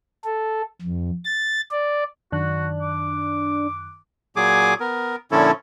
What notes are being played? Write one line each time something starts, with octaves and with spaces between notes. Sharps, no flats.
A4
F2
A6
D5
F#2 D#3 D4 F#4 F#6
D6
A#2 F#3 G#4 G#5 D6
B3 A#4
A#2 D3 F3 C#4 E4 A4